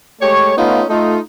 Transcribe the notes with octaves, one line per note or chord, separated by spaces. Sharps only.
G#3 A3 G4 C#5
A3 B3 C#4 D#4 F4
A3 D#4 F4